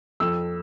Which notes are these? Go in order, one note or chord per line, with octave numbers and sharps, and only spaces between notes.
F2 E6